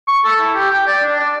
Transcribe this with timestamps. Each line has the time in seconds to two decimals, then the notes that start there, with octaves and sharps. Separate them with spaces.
0.08 C#6
0.25 A4
0.40 E4
0.54 G4
0.71 G5
0.87 D5
1.03 D4
1.19 D5